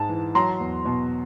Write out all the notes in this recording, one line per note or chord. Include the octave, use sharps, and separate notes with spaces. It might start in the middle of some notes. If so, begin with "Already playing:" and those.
Already playing: G#2 G#3 A5
E3
F#3 A#5 C6
E2
B2